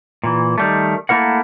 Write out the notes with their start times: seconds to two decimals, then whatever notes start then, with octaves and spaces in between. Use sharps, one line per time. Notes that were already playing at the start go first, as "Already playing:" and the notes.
0.23 A#2 E3
0.58 D#3 G3 A3
1.09 A3 A#3 E4 A#4 F#5